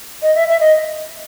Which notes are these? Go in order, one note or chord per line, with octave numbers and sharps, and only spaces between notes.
D#5
E5
E5
D#5